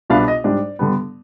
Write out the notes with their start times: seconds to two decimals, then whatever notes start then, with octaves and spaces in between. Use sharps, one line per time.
0.10 C2 B2 B3 D4 F5
0.28 D#5
0.44 G#2 G3 D4 D5
0.79 G2 D3 G3 B3